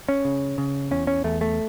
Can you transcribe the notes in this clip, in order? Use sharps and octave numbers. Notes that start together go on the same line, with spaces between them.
C#4
C#3
C#3
E2 C#4
C#4
E2 A3
A3